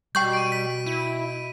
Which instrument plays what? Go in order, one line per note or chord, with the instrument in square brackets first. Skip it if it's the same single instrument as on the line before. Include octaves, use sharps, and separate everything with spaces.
[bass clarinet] B2 [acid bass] G3 [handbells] G5 C#6 G6
[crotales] D7 D#7
B6
[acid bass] E4 [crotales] D#7